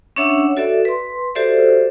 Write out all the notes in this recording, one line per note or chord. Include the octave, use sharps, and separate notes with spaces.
C#4 D4 C#5 E5 F#5 E6
F#4 A4 D5 E5
B4 C6
F#4 G4 A4 C5 D5 E5